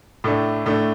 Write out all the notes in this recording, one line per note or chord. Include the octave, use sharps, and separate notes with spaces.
A2 A3 D4
A2 A3 D4